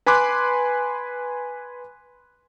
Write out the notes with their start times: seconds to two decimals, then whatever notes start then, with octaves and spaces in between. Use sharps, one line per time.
0.06 B4 G#5 B5 C6 D6 F#6